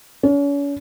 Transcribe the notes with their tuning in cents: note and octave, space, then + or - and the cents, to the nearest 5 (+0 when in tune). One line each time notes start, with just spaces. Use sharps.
C#4 +40